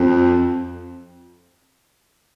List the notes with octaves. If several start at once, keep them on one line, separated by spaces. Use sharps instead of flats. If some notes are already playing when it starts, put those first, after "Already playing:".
Already playing: F2